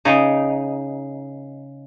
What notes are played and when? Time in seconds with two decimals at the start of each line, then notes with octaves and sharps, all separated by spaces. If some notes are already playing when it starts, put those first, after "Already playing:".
0.05 C#3 D#4